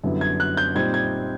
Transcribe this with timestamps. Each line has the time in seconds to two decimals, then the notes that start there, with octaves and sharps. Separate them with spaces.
0.04 F#2 D3 G3 B3 E4
0.21 G#6
0.40 F#6
0.57 G6
0.75 A#2 G3 C4 D#4 G#6
0.94 G#6